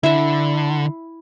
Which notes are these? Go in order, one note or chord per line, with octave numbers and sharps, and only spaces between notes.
D3 E4 E5